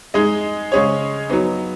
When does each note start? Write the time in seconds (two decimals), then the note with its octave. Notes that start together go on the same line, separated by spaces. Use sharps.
0.14 G#3 D#4 G#4 D#5
0.72 C#3 G#3 C#4 G#4 C#5
1.30 F#3 B3 D#4